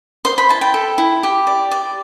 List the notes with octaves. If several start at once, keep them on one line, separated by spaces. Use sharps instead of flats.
C5 C6
B5
E4 A5
G5
A4
E4
G4
D5
D5